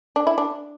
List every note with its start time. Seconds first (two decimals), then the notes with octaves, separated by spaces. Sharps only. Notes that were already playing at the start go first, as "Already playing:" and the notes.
0.16 D4
0.27 E4
0.38 D4